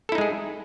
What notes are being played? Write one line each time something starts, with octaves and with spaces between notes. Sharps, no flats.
G#3 D#4 E4 G#4 A4